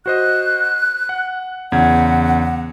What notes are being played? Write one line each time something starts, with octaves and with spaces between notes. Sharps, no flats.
F#4 C5 D#5 F#6
F#5
E2 C#3 F#5 G#6